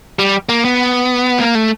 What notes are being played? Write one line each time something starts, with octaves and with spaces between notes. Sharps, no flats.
G3
A#3
B3
A#3
A3